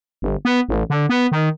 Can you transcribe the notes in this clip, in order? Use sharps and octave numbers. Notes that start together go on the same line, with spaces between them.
G1
B3
A1
D3
B3
D#3